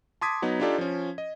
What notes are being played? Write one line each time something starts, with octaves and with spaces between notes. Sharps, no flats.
A5 C6 D6 D#6 G#6 B6
F#3 B3 D#4
D4 D#4 F4 G4 A4 D5
F3 C#4
D#5